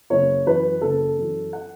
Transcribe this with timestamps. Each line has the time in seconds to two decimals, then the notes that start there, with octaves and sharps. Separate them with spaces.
0.10 F#1 C#5
0.46 F#2 E3 B4
0.81 F#1 A4
1.18 F#2 E3
1.53 F#5